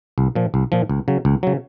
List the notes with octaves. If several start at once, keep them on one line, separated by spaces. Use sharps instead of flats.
C2
A#2 F3
C2
A#2 F3
C#2
C#3 F#3
C#2
C#3 F#3